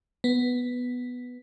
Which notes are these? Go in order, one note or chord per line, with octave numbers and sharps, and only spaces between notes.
B3